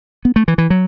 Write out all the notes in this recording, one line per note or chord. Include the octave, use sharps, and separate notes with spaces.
B3
A3
E3
E3
F#3